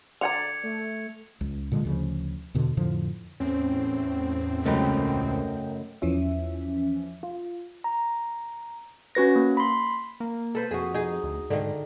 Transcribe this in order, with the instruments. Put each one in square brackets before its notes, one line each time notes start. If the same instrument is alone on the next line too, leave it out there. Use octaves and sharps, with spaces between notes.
[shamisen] D3 F#5 A#5 [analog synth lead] D5 [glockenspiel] G#6 C#7 F7
[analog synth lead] A3
[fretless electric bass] C#2
A#2 D3 G#3
D2 C#3 F3
E2 B2 D3
F2 A2 D3 F3
[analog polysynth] E2 A2 C4 [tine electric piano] C#4
[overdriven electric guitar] C#2 [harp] F#2 C#3 A3 [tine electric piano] A#4 D#5 G5
[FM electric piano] E2 E3 F3 C#4 E5
F4
[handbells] A#5
C#4 F#4 B4 A#6
A#3
B5 C6
[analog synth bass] A#3
[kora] A4 B4 C5
[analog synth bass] F2 [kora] F#4 G#4
[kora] D#4 G#4
[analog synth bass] D2
[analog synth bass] G#2 [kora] D3 D#3